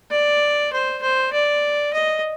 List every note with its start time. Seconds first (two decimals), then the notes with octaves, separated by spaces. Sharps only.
0.11 D5
0.72 C5
1.02 C5
1.33 D5
1.93 D#5